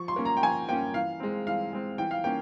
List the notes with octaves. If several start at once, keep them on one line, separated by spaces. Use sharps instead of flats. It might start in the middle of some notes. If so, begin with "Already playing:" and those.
Already playing: F3 C#6
C6
A#3 C#4
A#5
G5
F3 G#5
A#3 C#4 G5
E3 F5
G#3 C4
E3 F5
G#3 C4
E3 G5
F5
A#3 C#4 G5